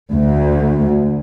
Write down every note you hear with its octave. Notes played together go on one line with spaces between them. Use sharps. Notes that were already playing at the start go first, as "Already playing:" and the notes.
D2